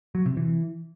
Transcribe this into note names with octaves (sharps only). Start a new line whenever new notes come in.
F#3
C3
E3